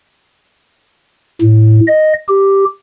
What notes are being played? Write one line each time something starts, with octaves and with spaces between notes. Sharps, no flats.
A2
D#5
G4